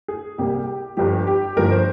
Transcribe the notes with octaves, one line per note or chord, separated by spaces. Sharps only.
G#4
C2 C3 G3 A#3 G4
G1 G2 F3 G4
G4
G1 G2 F3 A#4
C5